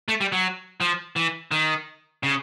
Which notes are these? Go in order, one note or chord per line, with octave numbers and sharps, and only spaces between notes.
A3
G3
F#3
F3
E3
D#3
C#3